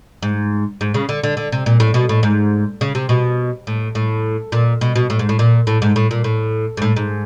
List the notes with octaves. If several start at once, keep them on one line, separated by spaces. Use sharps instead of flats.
G#2
G#2
C#3
D3
D3
D3
C3
A#2
A2
B2
A2
G#2
C#3
C3
B2
A2
A2
A#2
B2
B2
A2
G#2
A2
A#2
A2
G#2
A2
A#2
A2
G#2
A2
G#2